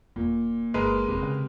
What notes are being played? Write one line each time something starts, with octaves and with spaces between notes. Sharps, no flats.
E1 A#2
G1 G#3 A#4 B4
F1 C3
C#3